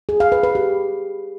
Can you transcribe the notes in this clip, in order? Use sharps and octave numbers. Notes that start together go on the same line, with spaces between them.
G#4
F5
B4
B4
G4